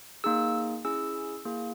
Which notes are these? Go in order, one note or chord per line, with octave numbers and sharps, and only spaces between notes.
A#3 D#4 G#4 E6
C#4 E4 G#4 E6
A#3 E4 G#4